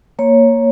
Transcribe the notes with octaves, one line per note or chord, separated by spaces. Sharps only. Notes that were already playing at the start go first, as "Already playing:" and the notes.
A#3 C#5